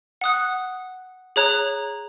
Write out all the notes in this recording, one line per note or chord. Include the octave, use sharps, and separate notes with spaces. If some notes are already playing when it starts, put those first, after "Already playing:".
F#5 D#6 F#6
G#4 C#5 A#5 F#6